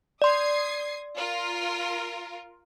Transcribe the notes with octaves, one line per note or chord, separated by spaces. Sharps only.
D5 C6 D#6 G#6 C7
F4 A#4